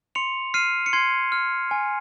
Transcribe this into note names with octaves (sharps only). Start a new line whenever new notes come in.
C6 C#7 F7
F6 C7 D#7
C#7
C6 G#6 C7
F6
G#5